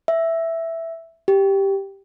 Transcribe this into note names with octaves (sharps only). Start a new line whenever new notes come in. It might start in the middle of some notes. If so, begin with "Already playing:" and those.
E5
G4